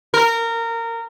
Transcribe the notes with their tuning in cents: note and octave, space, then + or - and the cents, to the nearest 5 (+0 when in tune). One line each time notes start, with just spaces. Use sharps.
A#4 -20